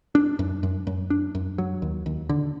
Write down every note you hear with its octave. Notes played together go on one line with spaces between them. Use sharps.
D4
F#2
F#2
F#2
D4
F#2
F#3
D#2
D#2
D3